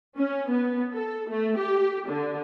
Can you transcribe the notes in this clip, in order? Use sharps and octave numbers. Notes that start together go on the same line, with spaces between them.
C#4
B3
A4
A3
G4
D3